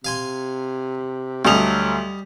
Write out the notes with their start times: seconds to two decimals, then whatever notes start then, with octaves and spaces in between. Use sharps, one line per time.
0.05 C3 F5 G#5 C6
1.45 D2 F#3 G3 A4 D#5 F7